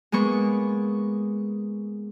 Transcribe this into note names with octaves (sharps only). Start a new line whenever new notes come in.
G#3 A#3 B3 C#6